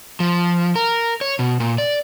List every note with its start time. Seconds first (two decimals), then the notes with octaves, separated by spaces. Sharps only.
0.20 F3
0.76 A#4
1.21 C#5
1.39 B2
1.60 A#2
1.78 D5